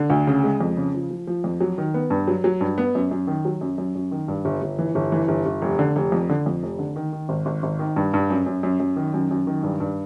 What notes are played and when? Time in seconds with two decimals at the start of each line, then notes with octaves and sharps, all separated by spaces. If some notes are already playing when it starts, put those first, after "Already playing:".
Already playing: D3
0.10 D2
0.27 C#3
0.44 G#3
0.61 F2
0.77 C#3
0.94 F3
1.11 F3
1.27 F3
1.44 F2
1.61 F#3
1.78 D#3
1.94 B3
2.10 G2
2.28 F#3
2.44 F#3
2.61 G2
2.78 B3
2.95 F#2
3.11 F#2
3.27 D#3
3.45 F#3
3.61 F#2
3.78 F#2
3.95 F#2
4.12 D#3
4.28 G2
4.45 G1
4.62 G1
4.78 E3
4.95 G1
5.12 E3
5.28 G1
5.46 G1
5.62 F1
5.79 D3
5.96 F1
6.12 F2
6.29 D3
6.46 F2
6.63 F1
6.79 D3
6.96 D#3
7.13 D#3
7.29 G#1
7.46 G#1
7.63 G#1
7.79 D#3
7.96 G2
8.14 G2
8.30 F#2
8.46 F#2
8.63 F#2
8.80 F#2
8.96 D#3
9.14 F#2
9.31 F#2
9.47 D#3
9.63 G2
9.80 G2